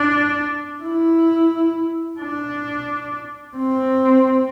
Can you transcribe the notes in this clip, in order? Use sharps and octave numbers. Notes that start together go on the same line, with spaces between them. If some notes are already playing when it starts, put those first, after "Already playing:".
Already playing: D4
E4
D4
C4